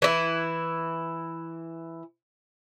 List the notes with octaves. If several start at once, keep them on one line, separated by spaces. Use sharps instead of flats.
E3 E4